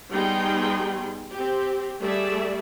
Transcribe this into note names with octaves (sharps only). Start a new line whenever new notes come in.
G3 B3 D#4 G#4 G5 C6
C4 G4
G3 A3 G#4 D5 E5